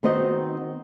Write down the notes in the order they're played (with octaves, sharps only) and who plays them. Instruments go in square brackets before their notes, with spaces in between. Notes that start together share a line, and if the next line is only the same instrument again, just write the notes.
[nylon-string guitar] D#3 B3 C4 D#4 F#4 D#5